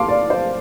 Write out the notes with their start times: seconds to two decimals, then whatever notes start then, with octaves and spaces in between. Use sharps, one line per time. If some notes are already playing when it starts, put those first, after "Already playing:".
Already playing: A3 F5 A5 C6 D6
0.08 D5
0.30 C5